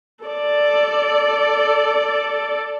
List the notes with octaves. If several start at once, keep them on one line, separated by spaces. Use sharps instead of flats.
A4 D5